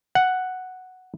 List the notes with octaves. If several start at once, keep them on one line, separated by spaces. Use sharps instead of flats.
F#5